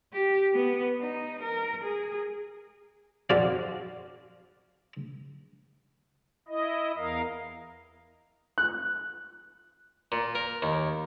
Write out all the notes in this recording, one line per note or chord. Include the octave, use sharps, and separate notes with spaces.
G4
B3
D#4
A#4
G#4
F2 F#4 D5 F5
E4 D#5
E2 A#4 F5
F#6
A#2
A#4
D#2